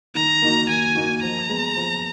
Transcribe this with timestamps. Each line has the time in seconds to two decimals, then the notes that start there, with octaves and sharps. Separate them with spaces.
0.15 D#3 A#5
0.42 A#3 D#4 F#4
0.68 D#3 G#5
0.95 A#3 D#4 F#4
1.23 F3 A#5
1.49 G#3 B3
1.77 F3